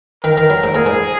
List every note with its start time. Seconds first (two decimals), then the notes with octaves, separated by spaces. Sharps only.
0.24 D#3 A#4
0.37 D#3
0.50 F#3
0.63 G#2
0.75 A#2 G#4
0.86 G#2